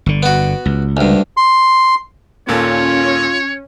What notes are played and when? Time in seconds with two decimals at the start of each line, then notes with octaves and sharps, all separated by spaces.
0.06 G1 D3
0.23 B3 F#4
0.66 C#2
0.97 D2 G2
1.37 C6
2.48 D#2 A#2 C#4 F4 A4 C#5